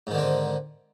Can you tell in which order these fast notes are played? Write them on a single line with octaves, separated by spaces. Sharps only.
G#2 D#3 D3 C4